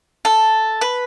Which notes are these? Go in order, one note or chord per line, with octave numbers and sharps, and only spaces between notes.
A4
B4